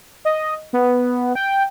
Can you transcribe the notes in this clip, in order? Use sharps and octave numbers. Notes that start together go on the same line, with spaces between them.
D#5
B3
G5